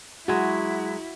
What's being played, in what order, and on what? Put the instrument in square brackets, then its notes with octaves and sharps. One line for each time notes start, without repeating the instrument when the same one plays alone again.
[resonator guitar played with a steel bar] F#3 G#3 [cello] E4 [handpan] F#4